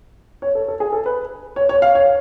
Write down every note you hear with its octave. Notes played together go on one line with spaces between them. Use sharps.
C#5
A4
A4
G#4
A4
B4
C#5
C#5
F5
C#5